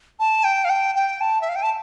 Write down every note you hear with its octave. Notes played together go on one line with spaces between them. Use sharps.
A5
G5
F5
G5
G5
A5
E5
F5
G5
A5